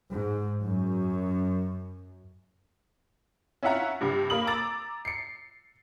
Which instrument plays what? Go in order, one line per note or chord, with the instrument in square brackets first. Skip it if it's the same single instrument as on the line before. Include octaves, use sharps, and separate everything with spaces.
[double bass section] G#2
F#2
[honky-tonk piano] C#4 E4 F4 E5 F#5 A#5
G2 C3 G3
A#3 A#4 B5 D#6 F#7
A#5 D6 E6 A6
C7 C#7